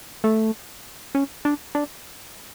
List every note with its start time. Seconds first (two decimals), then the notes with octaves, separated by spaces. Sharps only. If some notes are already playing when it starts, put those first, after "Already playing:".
0.24 A3
1.15 C#4
1.45 D4
1.75 D4